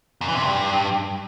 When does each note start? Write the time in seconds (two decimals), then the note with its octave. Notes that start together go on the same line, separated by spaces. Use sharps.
0.21 F#2
0.28 E3
0.35 C3
0.42 G2